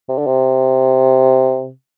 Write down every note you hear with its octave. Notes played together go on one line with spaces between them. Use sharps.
C3
D3
C3